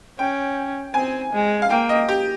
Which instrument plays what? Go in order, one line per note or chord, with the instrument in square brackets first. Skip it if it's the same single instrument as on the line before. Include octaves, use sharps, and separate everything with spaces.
[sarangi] C#4 [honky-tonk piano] G5
[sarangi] C4 [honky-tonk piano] G#5
[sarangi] G#3
[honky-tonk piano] F5
[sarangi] A#3 [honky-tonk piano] G5
[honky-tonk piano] D#5
G4